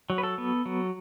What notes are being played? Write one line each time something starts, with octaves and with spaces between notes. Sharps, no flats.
F#3
B4
A4
B3
F#3